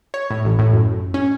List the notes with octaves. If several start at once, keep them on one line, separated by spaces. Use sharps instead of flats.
C#5
A2
A1
A2
F#2
C#4